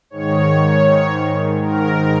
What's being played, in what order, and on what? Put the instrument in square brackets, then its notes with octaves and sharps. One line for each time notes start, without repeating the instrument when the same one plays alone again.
[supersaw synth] G#2 D#3 C#5
G#2 D#3 A#4